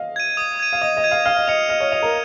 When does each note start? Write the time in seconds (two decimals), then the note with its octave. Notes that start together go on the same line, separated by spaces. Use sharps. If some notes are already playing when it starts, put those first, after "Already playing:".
Already playing: D#5 F5
0.16 G#6 D#7
0.37 D#6
0.60 G#6 D#7
0.73 F5
0.82 D#5 D#6
0.97 D#5
1.04 G#6 D#7
1.11 F5
1.25 F5 F6
1.36 D#5
1.47 D#5 C#7 F7
1.69 D#5 F6
1.80 C#5
1.91 D#5 C#7 F7
2.02 A#4